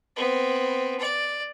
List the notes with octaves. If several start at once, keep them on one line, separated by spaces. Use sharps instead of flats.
B3 C4
D5